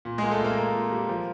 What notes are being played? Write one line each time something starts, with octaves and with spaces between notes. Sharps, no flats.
A#2
G#3 A#3 G#4
A3 A4
A#2 A#3 A#4
A#3
A#2
G3
F3